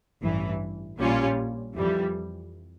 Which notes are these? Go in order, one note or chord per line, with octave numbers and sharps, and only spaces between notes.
A1 G2 E3
A#1 A#2 G3 C#4 F4
F2 E3 G3